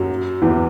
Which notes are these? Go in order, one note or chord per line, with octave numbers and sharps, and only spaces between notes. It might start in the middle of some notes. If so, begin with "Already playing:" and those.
Already playing: F#2 F#3
E2 E3